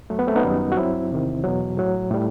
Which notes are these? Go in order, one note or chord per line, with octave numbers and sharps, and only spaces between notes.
F#2 F#3 A3
B3
A3 C4
B3 D#4
F#2 D#3 G3
F#4
G2 F#3 C4 E4
E2 C3 D#3
E2 B2 F#3
A2 F#3
A2 G3